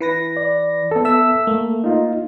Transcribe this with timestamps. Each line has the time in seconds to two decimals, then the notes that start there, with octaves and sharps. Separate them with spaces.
0.01 E3 B4 A#6
0.37 D5
0.91 B3 A4
1.05 E5 E6
1.47 A3 A#3
1.84 D#4 F4